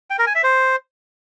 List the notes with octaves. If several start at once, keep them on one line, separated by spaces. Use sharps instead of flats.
G5
A#4
G#5
E5
C5